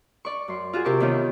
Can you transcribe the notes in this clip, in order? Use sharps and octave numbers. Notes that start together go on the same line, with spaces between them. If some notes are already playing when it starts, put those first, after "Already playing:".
D5 C#6
F#2 C6
F4 F#4 G#4
C3 G4 A#4 D5 C#6
D#3 E3 B3 C#4 F4